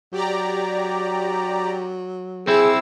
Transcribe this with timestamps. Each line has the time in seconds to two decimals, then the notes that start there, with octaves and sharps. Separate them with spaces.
0.13 F#3 G4 D5 A#5
2.47 C4 E4 G#4 E6